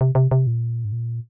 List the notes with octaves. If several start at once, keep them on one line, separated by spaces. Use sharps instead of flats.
C3
C3
C3
A#2
G#2
A#2